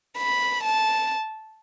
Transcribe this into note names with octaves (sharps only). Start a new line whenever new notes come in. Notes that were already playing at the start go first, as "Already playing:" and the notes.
B5
A5